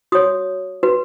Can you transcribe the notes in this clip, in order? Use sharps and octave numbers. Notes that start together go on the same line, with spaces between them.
F#4 C#5 D#6
F#4 B4